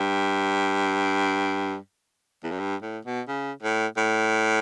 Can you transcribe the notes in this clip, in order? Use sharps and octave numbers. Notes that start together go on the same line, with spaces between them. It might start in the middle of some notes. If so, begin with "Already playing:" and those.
Already playing: G2
E2
F#2
G2
A2
B2
C#3
A2
A2